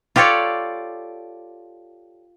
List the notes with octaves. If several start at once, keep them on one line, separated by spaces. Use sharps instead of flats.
F4 G4 A4 C#5 D5